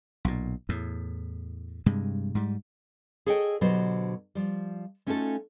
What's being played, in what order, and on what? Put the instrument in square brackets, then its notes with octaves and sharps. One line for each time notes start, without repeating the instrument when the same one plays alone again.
[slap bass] B1 A#2
E2 A2
G2 C3 G#3
G#2 G3
[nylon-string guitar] G#4 A4 C#5 D#5 E5 G5
B2 D3 F#3 G4 C5
F3 G3
A3 C#4 D#4 F4 F#4 A4